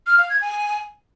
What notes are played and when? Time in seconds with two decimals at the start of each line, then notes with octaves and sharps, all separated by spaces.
0.07 F6
0.18 F5
0.30 G#6
0.41 G#5